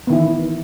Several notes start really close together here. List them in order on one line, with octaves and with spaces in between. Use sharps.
B3 D#3 E4 E3